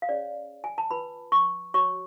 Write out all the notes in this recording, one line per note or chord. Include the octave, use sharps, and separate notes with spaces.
F5
C#4 G#4 C#5 D5
G#5
A5
F4 B4 B5
C#6
F#4 C#5 C#6